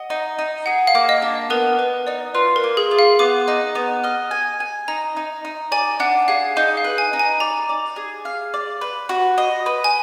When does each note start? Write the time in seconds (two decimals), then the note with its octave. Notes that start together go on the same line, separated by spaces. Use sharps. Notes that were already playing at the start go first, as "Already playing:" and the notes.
Already playing: D#5 F#5
0.10 D#4
0.39 D#4
0.66 G#4 F#5
0.87 F5
0.95 A#3
1.09 D#5
1.22 D4
1.50 B3 A#4
1.79 B3 B4
2.07 D#4 D5
2.35 F4 B4
2.56 A#4
2.64 A#3
2.77 G#4
2.91 F4
2.99 F5
3.19 B3 D6
3.48 D#4
3.75 B3
4.04 D#5 F6
4.31 G#5
4.60 G#5
4.88 D#4 A#5
5.16 D#4
5.45 D#4
5.72 D5 G#5
6.00 D4 F#5
6.28 G#4 F5
6.56 D#4 F5
6.77 F5
6.84 B4
6.98 G#5
7.13 D#4
7.19 G#5
7.40 D5 A#5
7.69 D5
7.96 G#4
8.25 F5
8.54 D5
8.81 B4
9.09 F#4
9.38 D#5
9.66 B4
9.84 G#5